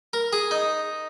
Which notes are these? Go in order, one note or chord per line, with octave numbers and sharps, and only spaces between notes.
A#4
G#4
D#4